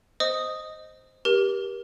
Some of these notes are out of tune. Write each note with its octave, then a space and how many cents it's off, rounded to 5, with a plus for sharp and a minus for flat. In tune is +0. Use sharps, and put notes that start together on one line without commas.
C5 +0 D#5 +0 D#6 +0
G4 +0 A#4 +35